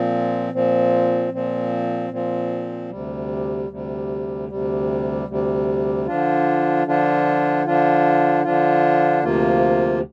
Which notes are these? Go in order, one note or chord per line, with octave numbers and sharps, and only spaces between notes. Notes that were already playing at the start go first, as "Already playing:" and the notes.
Already playing: A#2 F3 C4
A#2 F3 C4
A#2 F3 C4
A#2 F3 C4
D2 C3 G3
D2 C3 G3
D2 C3 G3
D2 C3 G3
D3 F3 D4 F4
D3 F3 D4 F4
D3 F3 D4 F4
D3 F3 D4 F4
D2 C3 F3 A#3 F4